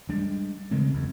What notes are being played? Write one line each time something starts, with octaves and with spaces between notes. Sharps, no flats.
G3 G#3 D4
C#3 G#3 C4
F#1 E2